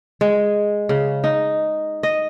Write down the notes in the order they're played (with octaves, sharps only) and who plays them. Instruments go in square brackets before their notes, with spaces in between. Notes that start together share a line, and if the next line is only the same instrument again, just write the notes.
[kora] G#3
C#3
D#4
D#5